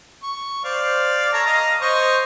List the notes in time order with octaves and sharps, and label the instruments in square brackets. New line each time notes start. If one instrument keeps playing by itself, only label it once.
[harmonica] C#6
[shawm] C5 [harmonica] D5 F5
[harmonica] A4 C#5 [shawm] A#5
[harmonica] D#5 F5
[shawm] C5 [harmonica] C#5 D#5 C#6